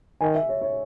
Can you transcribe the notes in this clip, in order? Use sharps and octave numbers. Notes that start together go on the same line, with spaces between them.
D#3 G#5
E5
C#5
C#5